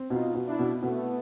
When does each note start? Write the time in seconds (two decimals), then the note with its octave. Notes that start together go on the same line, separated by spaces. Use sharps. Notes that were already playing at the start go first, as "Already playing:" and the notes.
Already playing: C4
0.10 B2 D#4 F4
0.35 B2
0.47 D4 E4
0.59 B2
0.82 B2 A3 B3